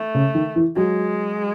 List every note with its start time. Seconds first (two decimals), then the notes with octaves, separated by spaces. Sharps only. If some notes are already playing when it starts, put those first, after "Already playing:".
Already playing: A3
0.15 C#3
0.35 D#3
0.56 E3
0.77 F#3 G#3